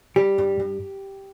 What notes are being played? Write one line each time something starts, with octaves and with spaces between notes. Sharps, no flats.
G3 G4
G2
G2